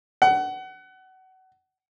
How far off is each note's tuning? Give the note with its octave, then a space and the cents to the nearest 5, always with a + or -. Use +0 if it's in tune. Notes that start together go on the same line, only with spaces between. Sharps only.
F#5 +25